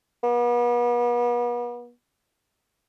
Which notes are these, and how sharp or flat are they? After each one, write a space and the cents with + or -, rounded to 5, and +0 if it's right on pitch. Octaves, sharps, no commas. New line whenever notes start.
B3 -40